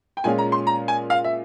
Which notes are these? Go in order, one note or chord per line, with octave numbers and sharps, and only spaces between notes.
G5
A#2 G#3 C#4 F4 G#5
A#5
C6
A#5
G#5
F5
E5